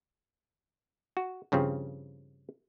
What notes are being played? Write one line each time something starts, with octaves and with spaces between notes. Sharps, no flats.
F#4
G2 C#3 F3 C4